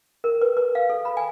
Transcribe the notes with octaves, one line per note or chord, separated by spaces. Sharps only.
A#4
B4
B4
F5
A4
B5
G#5